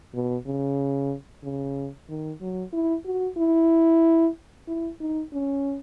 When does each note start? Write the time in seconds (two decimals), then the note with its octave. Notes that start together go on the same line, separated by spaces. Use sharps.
0.14 B2
0.47 C#3
1.44 C#3
2.09 D#3
2.41 F#3
2.73 E4
3.05 F#4
3.38 E4
4.68 E4
5.00 D#4
5.33 C#4